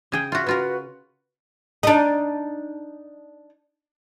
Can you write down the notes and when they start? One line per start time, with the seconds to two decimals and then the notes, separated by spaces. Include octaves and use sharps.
0.12 C#3 G#4 G5
0.32 F4 F#4 E5
0.47 C#3 F4 F#4 A#4 B4
1.83 D4 D#4